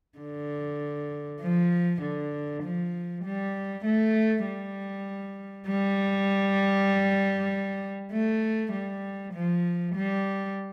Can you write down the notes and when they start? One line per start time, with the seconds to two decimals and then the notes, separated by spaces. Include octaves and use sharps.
0.19 D3
1.41 F3
2.02 D3
2.63 F3
3.24 G3
3.85 A3
4.46 G3
5.68 G3
8.12 A3
8.73 G3
9.34 F3
9.95 G3